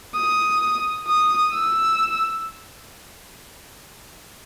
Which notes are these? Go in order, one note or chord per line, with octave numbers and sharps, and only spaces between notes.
D#6
D#6
E6